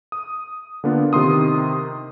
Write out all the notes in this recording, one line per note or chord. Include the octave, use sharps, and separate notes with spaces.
D#6
D3 A#3 B3 D4 F4
C3 D#3 C6 D#6